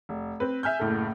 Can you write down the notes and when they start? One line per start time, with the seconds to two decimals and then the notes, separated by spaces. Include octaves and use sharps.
0.09 F1
0.40 C4 B4
0.63 E5 G#5 F6 G6
0.80 F#1 A2 A4